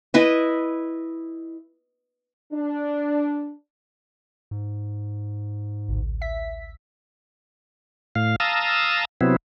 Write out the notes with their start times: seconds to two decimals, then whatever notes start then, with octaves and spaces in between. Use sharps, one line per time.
0.14 E4 B4 D#5
2.53 D4
4.51 G#2
5.88 A1 D2
6.21 E5 B6
8.16 A2 F5
8.40 F5 A5 A#5 D#6 E6
9.21 C3 F#3 B3 C4 E4